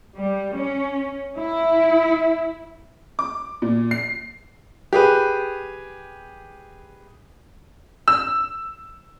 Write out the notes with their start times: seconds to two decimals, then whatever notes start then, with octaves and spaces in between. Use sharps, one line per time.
0.16 G3
0.55 C#4
1.36 E4
3.19 D6
3.62 A#2
3.91 C7
4.93 G4 G#4 B4
8.08 E6